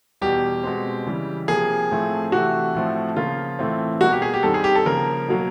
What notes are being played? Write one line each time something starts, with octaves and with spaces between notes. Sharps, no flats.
E2 B2 G3 G4
B2 G#3 C4
C#3 E3 G3
C3 F3 A#3 G#4
A2 F3 A3 C4
C3 E3 A3 F#4
A2 F3 A3 C4
C#3 F3 A#3 F4
A2 E3 A3 C4
B2 G3 A#3 F#4
G4
G#4
G4
G2 D#3 G3 C4 A4
G#4
G4
A4
C#3 F3 A#3 A#4
B2 F#3 A#3